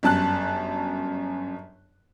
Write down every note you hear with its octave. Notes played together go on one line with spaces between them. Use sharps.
G1 F#2 A5 F#6